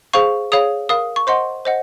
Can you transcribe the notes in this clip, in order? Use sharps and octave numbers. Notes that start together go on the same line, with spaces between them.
G#4 C5 F5 C#6
G#4 C#5 F5 D#6
A#4 F5 D#6
C#6
C5 D#5 F#5 C6
C5 D#5 F#5